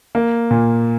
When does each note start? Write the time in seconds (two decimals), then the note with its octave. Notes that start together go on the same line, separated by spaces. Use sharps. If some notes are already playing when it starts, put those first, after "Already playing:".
0.15 A#3
0.51 A#2